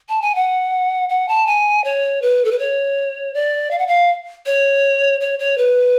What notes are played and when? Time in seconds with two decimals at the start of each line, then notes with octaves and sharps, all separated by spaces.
0.09 A5
0.22 G#5
0.35 F#5
1.09 F#5
1.28 A5
1.47 G#5
1.84 C#5
2.22 B4
2.45 A4
2.51 B4
2.59 C#5
3.34 D5
3.71 F5
3.79 F#5
3.87 F5
4.46 C#5
5.21 C#5
5.39 C#5
5.58 B4